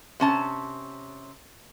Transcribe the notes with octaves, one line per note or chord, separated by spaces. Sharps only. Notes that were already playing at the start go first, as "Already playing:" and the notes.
C3 C#4 A5